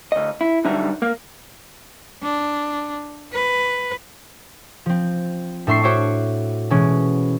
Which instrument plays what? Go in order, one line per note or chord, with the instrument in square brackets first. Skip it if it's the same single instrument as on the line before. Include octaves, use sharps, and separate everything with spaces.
[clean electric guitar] D2 D#5
E4
D3 F#3 G3 D#4 E5 A#5
A#3 A#4
[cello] D4
B4
[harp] F3 C4
A2 D4 E5 C6 C#6 C7
F#4 C5 C#5 E5 D6
B2 E3 G#3 C#4